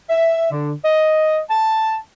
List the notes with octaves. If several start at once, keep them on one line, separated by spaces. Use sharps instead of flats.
E5
D3
D#5
A5